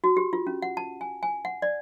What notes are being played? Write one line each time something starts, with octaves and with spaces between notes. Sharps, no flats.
F#4
G4
F4
C#4
F#5
A5
G#5
G#5
F#5
D5